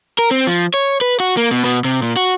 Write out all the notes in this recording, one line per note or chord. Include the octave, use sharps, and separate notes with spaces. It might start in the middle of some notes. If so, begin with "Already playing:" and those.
A#4
C4
F3
C#5
B4
F#4
A#3
B2
B2
C3
A#2
F#4